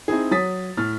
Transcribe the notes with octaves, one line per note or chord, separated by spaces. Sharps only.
C4 D#4 E4 G#4
F#3 D#6 A6 B6
A2 F6 A6